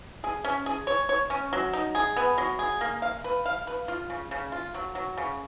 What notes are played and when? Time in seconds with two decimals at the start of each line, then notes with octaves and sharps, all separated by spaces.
0.24 G#4
0.44 C#4
0.66 G#4
0.87 C#5
1.09 C#5
1.30 C#4
1.53 F#3
1.73 D#4
1.95 G#4
2.17 B3
2.38 F#3
2.59 G#4
2.81 A#3
3.02 F5
3.24 B4
3.46 F5
3.67 B4
3.88 F4
4.10 C#3
4.31 C#3
4.52 F4
4.74 F#3
4.95 F#3
5.18 C#3